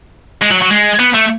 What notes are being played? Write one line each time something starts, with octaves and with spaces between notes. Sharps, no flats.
G#3
F#3
F#3
G#3
B3
A3